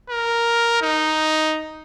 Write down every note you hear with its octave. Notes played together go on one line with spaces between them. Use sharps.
A#4
D#4